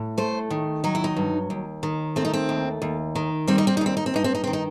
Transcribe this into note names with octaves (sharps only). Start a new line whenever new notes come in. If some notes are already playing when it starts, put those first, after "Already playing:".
Already playing: A2
A3 C5
D#3
F#3 D#4
E4
D#4
G2
D#2
D#3
A3 C4
D#4
C4
D#2
D#2
D#3
G3 C4
D#4
C4
D#4
D#2 C4
D#4
C4
G2 D#4
C4
D#4
D#3 C4
D#4